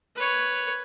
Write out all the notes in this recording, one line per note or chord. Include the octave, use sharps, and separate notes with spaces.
B4 C#5